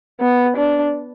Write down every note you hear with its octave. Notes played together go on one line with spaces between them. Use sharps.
B3
D4